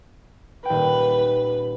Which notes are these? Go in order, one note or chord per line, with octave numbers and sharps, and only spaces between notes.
D#1 B4 G5